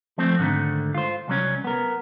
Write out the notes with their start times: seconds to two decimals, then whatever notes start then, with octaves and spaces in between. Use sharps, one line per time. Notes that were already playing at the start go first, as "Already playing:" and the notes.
0.18 F3 A3 C4
0.39 G#2 D3 D#3 A3
0.94 F4 C5
1.28 C2 F#3 C#4
1.64 B3 A#4